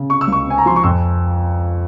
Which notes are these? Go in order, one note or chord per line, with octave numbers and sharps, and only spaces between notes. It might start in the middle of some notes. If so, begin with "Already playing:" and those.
Already playing: C#3
C3 C#6
E6
C#2 C#6
C4 G#5
A#5
F3 C6
C#6
F2 E6